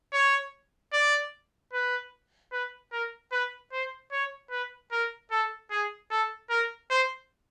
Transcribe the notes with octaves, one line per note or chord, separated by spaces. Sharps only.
C#5
D5
B4
B4
A#4
B4
C5
C#5
B4
A#4
A4
G#4
A4
A#4
C5